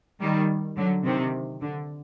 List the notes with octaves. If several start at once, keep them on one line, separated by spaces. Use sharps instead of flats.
D#3 G3
D3 F#3
C3 D#3
D3